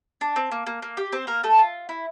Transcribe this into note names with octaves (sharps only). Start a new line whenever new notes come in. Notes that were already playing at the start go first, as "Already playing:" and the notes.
D4
C4
A#3
A#3
A#3
G4
C4 C5
A#3 A#4
A3 A4
F4
E4